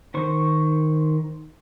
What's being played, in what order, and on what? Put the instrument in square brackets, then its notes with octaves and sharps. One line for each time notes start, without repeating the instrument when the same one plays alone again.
[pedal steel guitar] D#3 C5 C#6